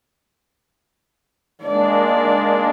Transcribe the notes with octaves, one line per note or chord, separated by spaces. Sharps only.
G#3 A#3 D4 D5